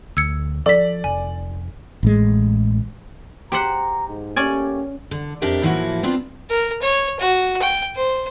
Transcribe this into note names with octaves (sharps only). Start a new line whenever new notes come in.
D2 E6 G#6 C#7
F3 A4 D5 B6
F1 G#5
A1 A2 G#3
G4 C5 F#5 A#5
G#2
A3 A#3 C#4 G4 D5 G#5
D3
F2 D4 G4 A#4 E5
A2 E3 F3 A#3 E4 F#4
B3 C4 D4 F4
A#4
C#5
F#4
G5
C5